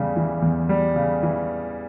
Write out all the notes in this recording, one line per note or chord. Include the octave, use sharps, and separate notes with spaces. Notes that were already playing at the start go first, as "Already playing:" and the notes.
Already playing: E2 C#3 G3
E3
E2
G3
C#3
E3